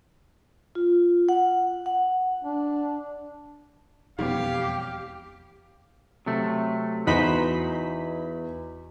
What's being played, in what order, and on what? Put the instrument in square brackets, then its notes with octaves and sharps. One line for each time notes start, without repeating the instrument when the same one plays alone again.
[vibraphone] F4
F#5
F#5
[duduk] D4
[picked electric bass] E1 F2 B3 [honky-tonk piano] G3 C#4 [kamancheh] G4 [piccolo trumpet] F5
[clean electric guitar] C3 F#3 A3
[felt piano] E2 [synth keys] D#4 B5 B6 [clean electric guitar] F#4 B4 C5